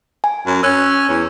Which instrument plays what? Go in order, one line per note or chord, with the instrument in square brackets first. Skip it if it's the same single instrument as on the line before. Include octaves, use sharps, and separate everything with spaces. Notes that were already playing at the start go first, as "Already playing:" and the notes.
[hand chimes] G#5
[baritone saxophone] F#2
[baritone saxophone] C#4 [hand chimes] E6 F#6
[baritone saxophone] E2